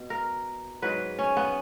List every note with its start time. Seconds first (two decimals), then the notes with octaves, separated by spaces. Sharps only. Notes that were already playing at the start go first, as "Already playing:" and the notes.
Already playing: B2
0.10 A#4
0.82 G#2 F#3 B4
1.19 C#4
1.37 B3